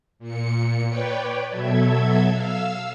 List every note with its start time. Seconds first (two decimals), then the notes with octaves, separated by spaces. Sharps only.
0.19 A#2 C#7
0.88 B4 C#5 D5 G5
1.50 B2 F#3 A4 E5 G#6
2.31 F5 E6